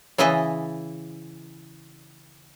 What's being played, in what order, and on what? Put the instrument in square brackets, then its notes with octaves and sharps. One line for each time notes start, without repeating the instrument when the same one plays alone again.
[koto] C#3 E3 E4 D#5 E5 A5